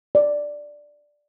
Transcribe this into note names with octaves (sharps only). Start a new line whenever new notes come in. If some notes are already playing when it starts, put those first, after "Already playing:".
D5